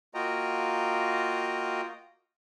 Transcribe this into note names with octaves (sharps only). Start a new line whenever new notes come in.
A#3 F4 F#4 D#5 G5 A#5